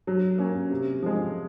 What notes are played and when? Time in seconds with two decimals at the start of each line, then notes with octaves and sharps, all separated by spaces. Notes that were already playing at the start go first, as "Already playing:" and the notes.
0.07 F#3
0.38 A#3 C#4
0.70 C3
1.02 F3 G#3